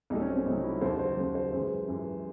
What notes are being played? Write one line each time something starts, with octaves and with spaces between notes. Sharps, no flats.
C2 C3 F#3 A3 D#4
C#4
C4
C#4
C2 C3 F#3 A3 D#4
E4
D#2 C#3 F#3 C5
C5
D#2 C#3 F#3
C5
F#2 E3 G#3
F#2 E3 G#3